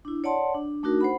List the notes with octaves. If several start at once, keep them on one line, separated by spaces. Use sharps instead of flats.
D4 E4
C#5 D5 F#5 A5 C6
D4
A3 D4 D#4 F#4 A#4
C5 F#5 B5